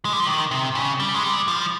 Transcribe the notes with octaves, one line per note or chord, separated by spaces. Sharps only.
G#3
G3
F3
D#3
C3
C#3
G3
G#3
G3
F3